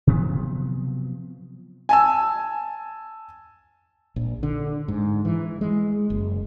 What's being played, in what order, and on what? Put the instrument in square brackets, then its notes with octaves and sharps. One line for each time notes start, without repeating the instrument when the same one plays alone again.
[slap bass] C3 F3 F#3 B3
[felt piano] G#5 A5 E6
[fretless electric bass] A#1
D3
G#2
E3
G#3
F#1